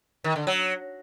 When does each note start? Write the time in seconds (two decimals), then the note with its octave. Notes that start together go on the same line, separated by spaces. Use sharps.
0.24 D#3
0.36 D3
0.47 F#3